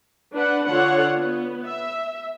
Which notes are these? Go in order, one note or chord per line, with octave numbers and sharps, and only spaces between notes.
D4 B4 F#5 B5
D3 D4 F4 A4 C#5 F#5
B3
E5